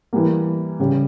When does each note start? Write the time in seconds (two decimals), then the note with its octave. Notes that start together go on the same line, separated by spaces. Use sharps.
0.13 E3 G3 A#3
0.80 C#3 G3 C#4